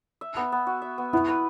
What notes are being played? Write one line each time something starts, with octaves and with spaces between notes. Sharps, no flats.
E5
B3
B3
F#4
E5
B3
B3 E4
B4